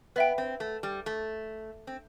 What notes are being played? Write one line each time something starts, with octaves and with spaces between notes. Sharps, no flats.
B3 B4 E5 G5
C4
A3
G3
A3
C4